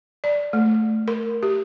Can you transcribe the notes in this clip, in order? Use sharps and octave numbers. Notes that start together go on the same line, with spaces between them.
D5
A3
A#4
G4